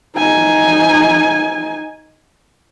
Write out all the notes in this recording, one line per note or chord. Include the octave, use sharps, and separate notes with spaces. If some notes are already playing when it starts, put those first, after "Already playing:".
D#4 G#5